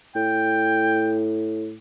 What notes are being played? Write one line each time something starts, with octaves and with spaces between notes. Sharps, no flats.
A2 G5